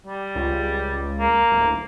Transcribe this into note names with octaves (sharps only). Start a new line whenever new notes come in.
G3
C#2
A#3
D1